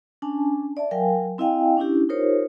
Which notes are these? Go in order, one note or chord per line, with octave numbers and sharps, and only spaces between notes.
C#4 D4 G#5 A5
D5 E5 A5
F#3 A#4 F5 G5 G#5
C4 E4 D#5 F5 G5 G#5
C#4 D4 E4 G4
D#4 F4 G4 A#4 C5 C#5